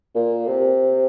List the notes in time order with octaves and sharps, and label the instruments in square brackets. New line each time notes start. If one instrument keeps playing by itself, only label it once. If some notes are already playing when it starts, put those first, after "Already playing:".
[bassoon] A#2
C3